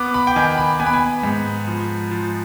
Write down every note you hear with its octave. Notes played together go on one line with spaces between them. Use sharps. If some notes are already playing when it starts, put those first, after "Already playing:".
Already playing: B3 D6
B5
G5
D#3 G#5
B5
B3 G#5
B5
G#5
G#2
F3
F3